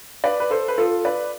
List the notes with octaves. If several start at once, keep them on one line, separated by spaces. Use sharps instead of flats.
B4 D5
B4
A4 C5
B4
F4 A4
B4 D5